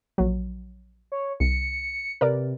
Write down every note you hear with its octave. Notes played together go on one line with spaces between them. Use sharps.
A#1 F#3
C#5
C2 C#7
C3 A#4 B4 D5